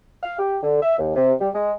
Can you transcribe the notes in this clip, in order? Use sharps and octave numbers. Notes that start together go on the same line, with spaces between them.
F5
G4
D3
E5
D#2
C3
G3
G#3